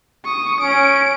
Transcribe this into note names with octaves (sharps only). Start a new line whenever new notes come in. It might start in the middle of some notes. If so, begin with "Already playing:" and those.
C#6 D#6
C#4 D7